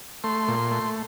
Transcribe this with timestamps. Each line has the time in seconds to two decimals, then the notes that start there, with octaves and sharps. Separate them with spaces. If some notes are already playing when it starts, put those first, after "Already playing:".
0.24 A3 C6
0.48 A#2
0.71 A3